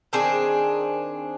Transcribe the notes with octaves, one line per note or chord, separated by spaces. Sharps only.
D#3 C4 D4 G#4